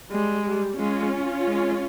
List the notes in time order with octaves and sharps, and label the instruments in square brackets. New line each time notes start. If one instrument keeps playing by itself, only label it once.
[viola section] G3 [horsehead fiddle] G#3
[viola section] G3
[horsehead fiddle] G#3 [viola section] C#4 F4
[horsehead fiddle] G#3